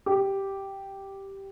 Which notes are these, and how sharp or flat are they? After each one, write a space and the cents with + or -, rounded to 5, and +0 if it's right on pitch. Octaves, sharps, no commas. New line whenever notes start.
G4 -5